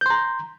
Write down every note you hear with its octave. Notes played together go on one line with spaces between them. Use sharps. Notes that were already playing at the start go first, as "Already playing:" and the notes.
A#5 C6 G6